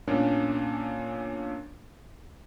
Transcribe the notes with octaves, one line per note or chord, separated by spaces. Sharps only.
A#2 A#3 B3 C#4 D4